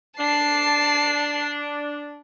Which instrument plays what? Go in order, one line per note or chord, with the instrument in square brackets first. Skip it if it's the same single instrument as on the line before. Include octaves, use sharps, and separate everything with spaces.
[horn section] D4 [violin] A5 C7